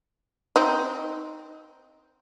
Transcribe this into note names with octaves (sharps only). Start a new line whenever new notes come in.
C4 D#4